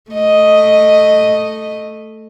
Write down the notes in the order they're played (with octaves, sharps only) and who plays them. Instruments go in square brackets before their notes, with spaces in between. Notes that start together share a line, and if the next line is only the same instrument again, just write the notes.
[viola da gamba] A3 D#5